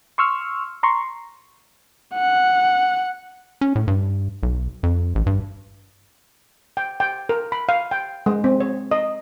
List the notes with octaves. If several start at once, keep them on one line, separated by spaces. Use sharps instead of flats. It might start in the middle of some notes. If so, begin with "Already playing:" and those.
C6 C#6 E6 F6
A#5 C6 C#6
F#5
C#4
A2
G2
B1
F2
A1
G2
G5
G5
A#4
B5
F5
G5
G#3
C4
C#5
D#5